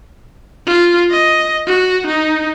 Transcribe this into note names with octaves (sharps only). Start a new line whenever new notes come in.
F4
D#5
F#4
D#4